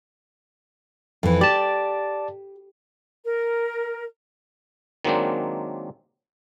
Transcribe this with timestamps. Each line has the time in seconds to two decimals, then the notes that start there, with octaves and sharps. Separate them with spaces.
1.23 F2 E3
1.41 G4 D5 A5
3.25 A#4
5.04 D#3 F#3 G#3 A#3 C4 D4